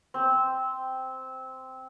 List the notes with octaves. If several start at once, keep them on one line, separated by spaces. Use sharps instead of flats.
C4 C5